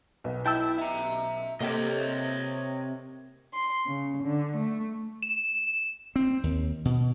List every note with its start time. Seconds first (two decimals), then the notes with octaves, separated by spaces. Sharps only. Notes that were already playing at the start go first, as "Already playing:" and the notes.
0.24 B1 B3
0.46 E4 G5 A5 E6
0.78 E5 A#5
1.60 C3 A#3 G4 A4 C#5 D#5
3.53 C6
3.86 C#3
4.23 D3
4.56 A3
5.22 E7
6.16 C4
6.43 D#2
6.85 B2